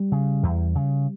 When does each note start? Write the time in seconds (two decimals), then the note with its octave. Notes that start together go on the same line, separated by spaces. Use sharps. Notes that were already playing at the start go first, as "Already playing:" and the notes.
Already playing: G3
0.12 C#3
0.43 E2
0.75 C#3